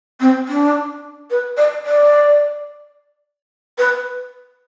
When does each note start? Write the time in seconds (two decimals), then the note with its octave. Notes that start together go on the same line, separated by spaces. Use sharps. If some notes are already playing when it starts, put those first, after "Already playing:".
0.20 C4
0.48 D4
1.30 B4
1.57 D5
1.85 D5
3.78 B4